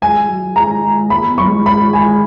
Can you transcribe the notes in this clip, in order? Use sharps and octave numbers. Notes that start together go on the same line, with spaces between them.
G#3 G#5
G#3
F#3
G#3 A#5
G#3
A#3 B5
B3
F#3 C#6
G#3
G#3 B5
G#3 G#5